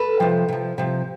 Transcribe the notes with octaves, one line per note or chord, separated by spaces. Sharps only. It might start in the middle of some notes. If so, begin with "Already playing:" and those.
Already playing: A4 B4
C3 F3
C3 F3
C3 F3